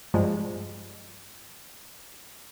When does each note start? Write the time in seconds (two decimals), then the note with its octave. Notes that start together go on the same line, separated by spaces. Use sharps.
0.14 G2 F3 G3 G#3